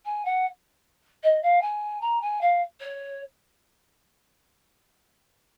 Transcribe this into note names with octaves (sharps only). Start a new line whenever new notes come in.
G#5
F#5
D#5
F5
G#5
A#5
G#5
F5
C#5